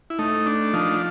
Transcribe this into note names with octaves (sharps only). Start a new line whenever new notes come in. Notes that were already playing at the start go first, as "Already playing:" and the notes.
E4
A3 D#4
D4
F3 D#4